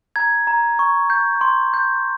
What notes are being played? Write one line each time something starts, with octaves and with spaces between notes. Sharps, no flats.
A#5 G#6
A#5
C#6
G6
C6
G6